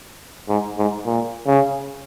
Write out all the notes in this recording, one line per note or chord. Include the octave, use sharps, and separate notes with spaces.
G#2
G#2
A#2
C#3